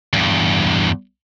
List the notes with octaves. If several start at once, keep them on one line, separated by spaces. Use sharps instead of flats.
E2 G2